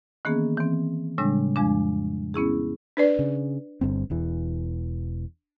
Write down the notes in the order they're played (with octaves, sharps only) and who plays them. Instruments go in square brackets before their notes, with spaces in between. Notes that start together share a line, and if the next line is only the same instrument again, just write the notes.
[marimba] D#3 E3 A#3 B3 C#4 G#4
E3 C4
A2 C#3 G3 G#3 D4
F2 F3 G#3 D4
B3 C#4 E4 G#4
[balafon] D4 B4 D5
[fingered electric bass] C#3
G1 G2 C4
E1 E2 E3